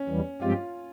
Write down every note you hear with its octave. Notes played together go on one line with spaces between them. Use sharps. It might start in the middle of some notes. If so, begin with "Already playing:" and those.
Already playing: C#4
E2 E3 G3
G2 F3 G#3 C4 F4 G4